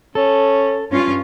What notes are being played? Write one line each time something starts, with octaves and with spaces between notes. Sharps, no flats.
C#4 A4
G2 C#4 F4